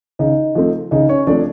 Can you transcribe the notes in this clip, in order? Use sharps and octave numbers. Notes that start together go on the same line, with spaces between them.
C#3 D#4 D#5
F3 A3 C4
C#3 D#4 D#5
C#4 C#5
F3 A3 C4 D4 D5